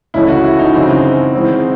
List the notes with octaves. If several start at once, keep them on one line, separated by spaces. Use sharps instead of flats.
C#2 C#3 E3 A3 C#4 E4
F#4
E4
D#4
F#2 C#3 E3 C4
E3 G#3 C4